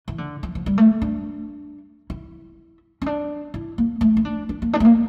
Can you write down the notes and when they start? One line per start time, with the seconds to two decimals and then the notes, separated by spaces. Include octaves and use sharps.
0.08 E3
0.18 D3
0.43 F3
0.55 F3
0.66 G3
0.78 A3
1.02 D4
2.10 E4
3.02 C#4
3.06 D4
3.54 E4
3.78 A#3
4.01 A3
4.17 E4
4.25 D4
4.49 D4
4.62 A#3
4.73 D4
4.80 A3
4.85 A#3